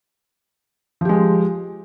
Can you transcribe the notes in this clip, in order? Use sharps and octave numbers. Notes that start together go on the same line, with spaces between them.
F3 G#3 G4